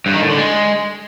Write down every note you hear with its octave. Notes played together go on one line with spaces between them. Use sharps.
G2
D#3
A2
D3
G#3